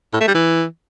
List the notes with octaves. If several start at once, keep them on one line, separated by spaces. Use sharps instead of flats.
A2
A3
G3
E3